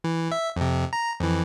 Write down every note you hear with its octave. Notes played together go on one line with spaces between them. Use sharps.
E3
E5
F2 C3
A#5
F2 E3